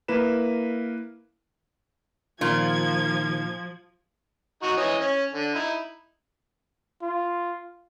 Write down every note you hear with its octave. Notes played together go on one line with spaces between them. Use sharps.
A#3 E4 A#4 B4 E7
A#2 D#3 F3 F4 G#6
D#4 F#4 C#6
E3 C#5 D#5
C#4
D3
D#4 E4
F4